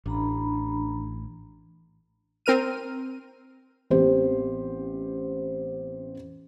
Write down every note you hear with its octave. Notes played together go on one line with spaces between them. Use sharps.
A1 D4 A#5 B5
C4 A#4 F6 D#7
A1 B3 C4 G4 C5